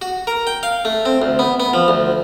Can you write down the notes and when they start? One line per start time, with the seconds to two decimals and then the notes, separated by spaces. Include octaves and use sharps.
0.02 F#4
0.27 A#4
0.47 G5
0.63 F5
0.85 A3
1.06 C4
1.22 D2
1.39 B3
1.60 B3
1.73 F3
1.88 D2